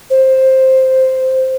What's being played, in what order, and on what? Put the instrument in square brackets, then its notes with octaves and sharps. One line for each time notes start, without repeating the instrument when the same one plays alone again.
[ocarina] C5